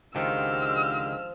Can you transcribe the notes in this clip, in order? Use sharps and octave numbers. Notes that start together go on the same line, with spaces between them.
C#2 D3 D#3 F3 G#3 G4 E6 F6